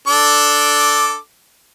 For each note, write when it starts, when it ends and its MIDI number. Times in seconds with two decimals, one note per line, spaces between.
0.08 1.16 62
0.08 1.16 69
0.08 1.16 86